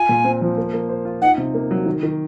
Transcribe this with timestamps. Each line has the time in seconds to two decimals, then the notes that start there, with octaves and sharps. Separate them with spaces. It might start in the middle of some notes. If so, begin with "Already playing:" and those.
Already playing: F4 G#5
0.09 A#2
0.24 C4
0.41 F3
0.58 A#3
0.73 A#3
0.89 C5
1.05 F4
1.22 D#4 F#5
1.38 C3
1.54 A#3
1.71 F#3
1.86 D#3
2.03 D#3